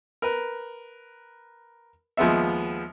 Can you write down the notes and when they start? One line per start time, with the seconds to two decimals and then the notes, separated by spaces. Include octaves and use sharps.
0.22 A#4 B4
2.17 D#2 F3 G#3 B3 E5